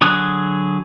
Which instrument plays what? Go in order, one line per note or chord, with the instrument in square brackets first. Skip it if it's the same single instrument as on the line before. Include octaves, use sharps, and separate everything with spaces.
[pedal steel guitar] D3 F#3 G#4 D#6 F#6